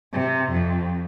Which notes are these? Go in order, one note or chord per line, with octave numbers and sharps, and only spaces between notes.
C3
F2